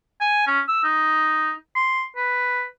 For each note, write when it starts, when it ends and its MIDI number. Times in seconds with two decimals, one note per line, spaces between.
0.21 0.47 80
0.47 0.60 61
0.69 0.84 88
0.84 1.53 63
1.76 2.05 84
2.17 2.65 71